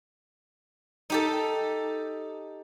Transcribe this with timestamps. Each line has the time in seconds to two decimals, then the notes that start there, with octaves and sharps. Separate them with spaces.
1.10 D#4 G4 A4